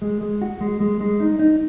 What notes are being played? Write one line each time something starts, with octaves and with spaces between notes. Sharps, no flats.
G#3
G#3
F#4
G#3
G#3
G#3
D#4
D#4